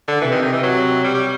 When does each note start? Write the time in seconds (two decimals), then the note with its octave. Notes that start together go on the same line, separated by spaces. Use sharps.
0.08 D3
0.21 C3 E3
0.32 D#3
0.42 D#3
0.52 E3
0.63 C3 F#3
1.04 G3
1.14 G3